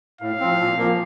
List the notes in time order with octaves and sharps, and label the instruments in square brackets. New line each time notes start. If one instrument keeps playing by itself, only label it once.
[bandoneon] A2 [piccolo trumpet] F5
[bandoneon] F3 C4
A#2
F3 A#3